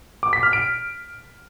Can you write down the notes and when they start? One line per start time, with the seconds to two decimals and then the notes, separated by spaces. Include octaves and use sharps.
0.23 D6
0.33 B6
0.43 F6
0.53 D7